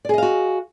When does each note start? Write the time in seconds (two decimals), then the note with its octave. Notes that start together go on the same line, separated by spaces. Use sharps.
0.05 D5
0.09 G#4
0.14 D#5
0.18 F5
0.22 F#4